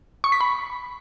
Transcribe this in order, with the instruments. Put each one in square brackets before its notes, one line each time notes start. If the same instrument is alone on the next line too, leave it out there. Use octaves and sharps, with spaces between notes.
[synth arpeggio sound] C#6
B6
B5